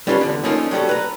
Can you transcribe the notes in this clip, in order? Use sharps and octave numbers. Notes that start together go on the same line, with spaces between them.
G3 C#4 E4 F4 A4 B4
E2 D3
F3 A3 A#3 C#4 D#4 F4
F#3 G3 A3 A4
B4 A#5